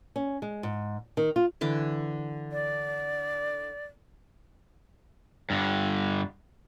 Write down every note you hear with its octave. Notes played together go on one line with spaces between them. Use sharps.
C#4
G#3
G#2
D#3
F4
D3 E3 D6
D5
G2 D3